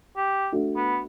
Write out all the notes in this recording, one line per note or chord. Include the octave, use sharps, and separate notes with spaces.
G4
A3 D4 F#4
B3